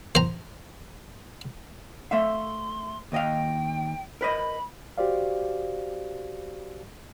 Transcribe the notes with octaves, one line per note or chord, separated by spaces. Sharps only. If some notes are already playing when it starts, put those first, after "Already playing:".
C5 A#5
A3 E5 F5 C6
D#2 D#5 F5 G5
A#4 B4 D#5 B5
F#4 G4 C5 D5 F5